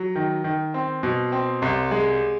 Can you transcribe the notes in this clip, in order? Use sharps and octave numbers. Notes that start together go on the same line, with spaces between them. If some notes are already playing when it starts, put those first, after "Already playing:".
Already playing: F#3
D#3
D#3
C4
B2
C4
C2
G#3